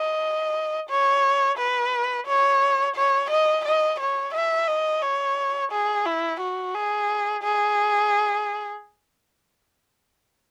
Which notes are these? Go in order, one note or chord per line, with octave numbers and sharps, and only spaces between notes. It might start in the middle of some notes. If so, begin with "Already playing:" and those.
Already playing: D#5
C#5
B4
C#5
C#5
D#5
D#5
C#5
E5
D#5
C#5
G#4
E4
F#4
G#4
G#4